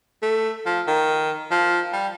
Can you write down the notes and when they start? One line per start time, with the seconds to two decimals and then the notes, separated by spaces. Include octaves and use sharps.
0.23 A3
0.66 F3
0.87 D#3
1.51 F3
1.93 G3